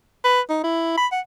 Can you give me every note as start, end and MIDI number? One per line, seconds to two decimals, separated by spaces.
0.24 0.41 71
0.50 0.60 63
0.64 0.97 64
0.97 1.07 83
1.12 1.20 78